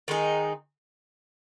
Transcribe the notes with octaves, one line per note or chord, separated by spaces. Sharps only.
D#3 G#3 D#4 G#4